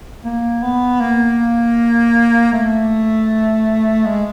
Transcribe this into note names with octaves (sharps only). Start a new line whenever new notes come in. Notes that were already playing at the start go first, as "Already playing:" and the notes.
A#3
B3
A#3
A3
G#3